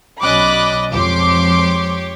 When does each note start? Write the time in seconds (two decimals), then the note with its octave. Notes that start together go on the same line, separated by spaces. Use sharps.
0.22 B1 F#3 C#4 D5 D#5 B5 D6 F#6
0.92 F2 F3 G#3 G4 C#5 C6 D6